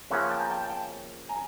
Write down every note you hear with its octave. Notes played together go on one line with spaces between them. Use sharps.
C#3 F3 A#3 C#4 E5 F#5
G5 A5
G#5 A#5
G5 A5
G5 A5
G#5 A#5